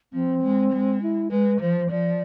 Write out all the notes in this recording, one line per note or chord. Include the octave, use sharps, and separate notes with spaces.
F3 C4
G#3
G#3
E4
G#3 B4
F3 C5
F3 D5